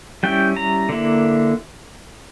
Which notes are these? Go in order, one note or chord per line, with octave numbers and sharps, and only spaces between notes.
G3 C#4 E4 G5
A#5
D3 A#3 E4